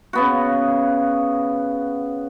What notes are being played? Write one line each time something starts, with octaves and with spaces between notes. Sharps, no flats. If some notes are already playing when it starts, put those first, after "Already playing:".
C#3 B3 F#4